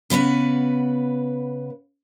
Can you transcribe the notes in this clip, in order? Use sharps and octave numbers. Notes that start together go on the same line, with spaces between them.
C#3 B3 B4 F#5